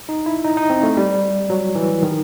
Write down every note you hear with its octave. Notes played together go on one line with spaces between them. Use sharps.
D#4
E4
D#4
D#4
C4
A3
G3
F#3
E3
D#3